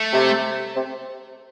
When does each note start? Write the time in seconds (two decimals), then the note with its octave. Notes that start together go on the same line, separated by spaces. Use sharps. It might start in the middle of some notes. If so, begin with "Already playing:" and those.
Already playing: A3
0.13 C3
0.76 C3